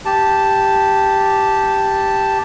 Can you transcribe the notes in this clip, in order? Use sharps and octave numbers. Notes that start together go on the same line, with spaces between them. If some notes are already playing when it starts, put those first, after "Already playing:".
G4 A5